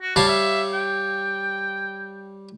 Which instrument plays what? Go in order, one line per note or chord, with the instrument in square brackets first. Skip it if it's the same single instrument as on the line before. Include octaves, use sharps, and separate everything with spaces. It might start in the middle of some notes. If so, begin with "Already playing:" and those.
[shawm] F#4
[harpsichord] G3 C#5 F5 [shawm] A5
[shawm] E5
G5